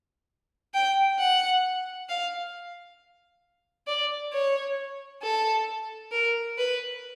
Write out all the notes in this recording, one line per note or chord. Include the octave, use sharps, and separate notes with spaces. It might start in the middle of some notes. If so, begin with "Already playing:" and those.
G5
F#5
F5
D5
C#5
A4
A#4
B4